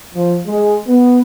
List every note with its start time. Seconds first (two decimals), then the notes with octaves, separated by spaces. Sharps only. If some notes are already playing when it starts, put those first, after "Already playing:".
0.15 F3
0.47 G#3
0.87 B3